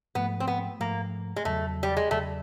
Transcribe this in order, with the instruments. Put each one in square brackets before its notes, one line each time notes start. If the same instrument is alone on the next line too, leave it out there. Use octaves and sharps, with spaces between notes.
[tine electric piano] G#2 F3 A3 [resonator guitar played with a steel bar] B3
[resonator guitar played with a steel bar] C4
B3
[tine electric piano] G#2 F3 A3 [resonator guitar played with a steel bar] A#3
[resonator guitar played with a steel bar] G#3
[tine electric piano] E2 C#3 F#3 [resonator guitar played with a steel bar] A3
[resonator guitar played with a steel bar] G3
G#3
[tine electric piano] E2 C#3 F#3 [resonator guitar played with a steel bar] A3